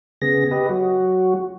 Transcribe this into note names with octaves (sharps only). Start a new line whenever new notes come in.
C#3 B3 G#4 A#6
G4 B4 D#5
F#3 F#4